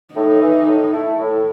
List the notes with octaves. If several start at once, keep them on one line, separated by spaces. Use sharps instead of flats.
A2 D#4
E3
A2
A3 E4
A2